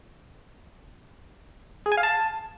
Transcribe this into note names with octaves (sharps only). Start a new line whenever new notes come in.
G#4
G#5
F5
A5